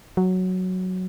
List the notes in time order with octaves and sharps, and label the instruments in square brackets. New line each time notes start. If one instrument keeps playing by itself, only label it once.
[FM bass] F#3